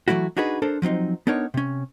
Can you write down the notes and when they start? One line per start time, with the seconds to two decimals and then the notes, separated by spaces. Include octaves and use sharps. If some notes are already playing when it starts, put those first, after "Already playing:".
0.08 E3 F#3 A3 E4 F#4
0.37 D4 D#4 F#4 G#4 B4
0.62 D4 A4 A#4 C5
0.82 F3 F#3 C4 D#4
1.27 B3 D4 D#4 A#4 C#5
1.54 C3 C#4